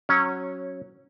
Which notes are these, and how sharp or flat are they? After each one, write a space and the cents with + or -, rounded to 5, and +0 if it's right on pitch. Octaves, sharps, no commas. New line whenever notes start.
F#3 +0 C#4 -15